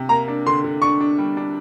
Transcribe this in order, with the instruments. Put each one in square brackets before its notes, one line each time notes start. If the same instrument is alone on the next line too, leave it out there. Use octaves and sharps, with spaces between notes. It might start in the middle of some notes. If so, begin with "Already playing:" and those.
Already playing: [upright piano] C3
[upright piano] A#3 [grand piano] A#5
[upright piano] D4
[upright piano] D3 [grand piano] C6
[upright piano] D3
[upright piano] D4 [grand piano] C#6
[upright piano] D4
G3
D4